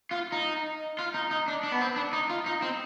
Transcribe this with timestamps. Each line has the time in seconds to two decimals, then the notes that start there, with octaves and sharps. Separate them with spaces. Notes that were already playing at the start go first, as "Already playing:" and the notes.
0.11 F4
0.32 D#4
0.99 F4
1.14 D#4
1.31 D#4
1.48 D4
1.63 D4
1.72 B3
1.81 C4
1.96 D4
2.13 D#4
2.30 F4
2.46 D#4
2.62 C4